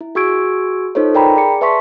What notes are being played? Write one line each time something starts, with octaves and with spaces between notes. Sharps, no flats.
E4
F#4 G#4 C#6 E6 G#6 D7
D#4 F4 A4 C5 C#5
A#4 D5 G5 A#5 B5
G#4 D5 C#7
B4 E5 A5 C6 C#6 B6